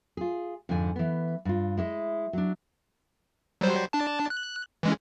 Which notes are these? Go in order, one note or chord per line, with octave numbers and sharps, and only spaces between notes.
F4 G#4
F2 G#2 D3 G#5
E3 B3
G2 F4
G#3 E4 D5 D#5
F#3 D4
F#3 G3 C5
D4 A5
F#6
E3 G#3 C#4